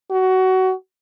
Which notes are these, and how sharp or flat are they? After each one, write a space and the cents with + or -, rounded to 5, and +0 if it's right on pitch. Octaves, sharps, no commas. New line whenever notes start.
F#4 +20